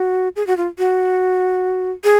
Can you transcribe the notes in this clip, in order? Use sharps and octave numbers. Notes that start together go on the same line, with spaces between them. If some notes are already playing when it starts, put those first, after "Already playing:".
Already playing: F#4
G#4
F#4
F4
F#4
G#4